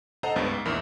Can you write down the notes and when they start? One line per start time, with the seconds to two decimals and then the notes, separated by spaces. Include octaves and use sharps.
0.23 A4 C5 D#5 F#5 A5 A#5
0.36 G1 C#2 G2 B3
0.51 G#2
0.65 A#1 E2 G#2 A#4 B5